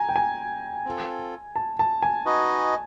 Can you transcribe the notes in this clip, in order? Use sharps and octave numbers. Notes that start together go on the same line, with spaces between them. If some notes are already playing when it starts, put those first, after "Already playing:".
Already playing: G#5 A#5
G5
G#5
C4 F4 A4
A5
A5
G#5
D#4 F#4 B4 D#5